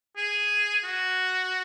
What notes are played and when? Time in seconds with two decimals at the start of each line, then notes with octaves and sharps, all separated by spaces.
0.17 G#4
0.84 F#4